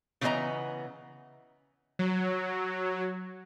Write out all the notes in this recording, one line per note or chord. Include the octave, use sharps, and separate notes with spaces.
C#3 E3 B3 G#4 D#5 A#5
F#3